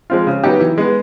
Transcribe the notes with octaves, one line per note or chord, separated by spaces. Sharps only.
F3 G#3 C4 F4
C#3
F#3 B3 D#4 G4
E3
G#3 B3